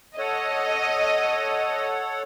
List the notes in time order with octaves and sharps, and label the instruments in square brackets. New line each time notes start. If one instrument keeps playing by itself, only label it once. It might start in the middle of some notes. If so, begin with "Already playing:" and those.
[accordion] A4 C#5 F#5 [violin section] D#5